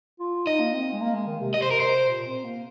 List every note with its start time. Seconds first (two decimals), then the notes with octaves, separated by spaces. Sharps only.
0.20 F4
0.46 D#4 D#5
0.60 A#3
0.74 C4
0.93 G#3
1.01 A#3
1.14 G#3
1.27 D#3
1.41 C3
1.54 C3 D#5
1.62 C5
1.71 A#4
1.80 C5
2.09 A#2
2.27 C4
2.44 A#3